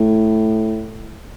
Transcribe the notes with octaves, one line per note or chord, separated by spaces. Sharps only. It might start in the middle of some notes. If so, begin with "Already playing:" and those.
Already playing: A2